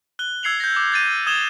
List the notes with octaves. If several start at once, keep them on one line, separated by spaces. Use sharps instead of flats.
F#6 G7
E6 G#6 C7 C#7 F7 F#7
G6 A#6
D6
G6 A6 D#7
D#6 G#6 E7 F7 G7